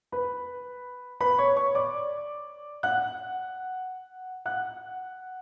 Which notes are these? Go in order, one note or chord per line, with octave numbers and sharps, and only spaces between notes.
B4 B5
B4 B5
C#5 C#6
C#5 C#6
D5 D6
F#5 F#6
F#5 F#6